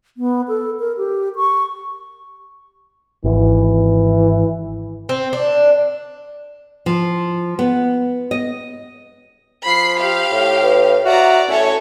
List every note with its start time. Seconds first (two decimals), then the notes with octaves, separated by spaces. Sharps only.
0.17 B3
0.48 A4
0.80 A#4
0.97 G4
1.36 C#6
3.24 G#1 E3
5.09 C4
5.33 D4
6.86 F3
7.59 B3
8.31 D#5
9.66 F3 B5 C7
10.00 G4 F5
10.31 A2
10.62 B4
11.05 F#4 D5 E5 A#5
11.48 A2 C#4 A4 C#5